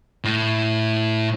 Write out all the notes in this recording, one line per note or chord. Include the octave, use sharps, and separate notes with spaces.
A2